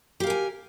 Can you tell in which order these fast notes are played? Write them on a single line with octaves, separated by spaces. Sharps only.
G4 F5 A#4 G#5